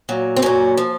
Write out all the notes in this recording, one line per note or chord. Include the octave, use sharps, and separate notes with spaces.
A#2 F#3
C4
A#2 F#3 C#4
F3